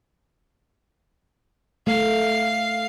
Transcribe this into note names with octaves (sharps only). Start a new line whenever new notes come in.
A3 F5